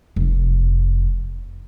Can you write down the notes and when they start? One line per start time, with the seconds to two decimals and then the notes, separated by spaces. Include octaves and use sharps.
0.16 F1 F2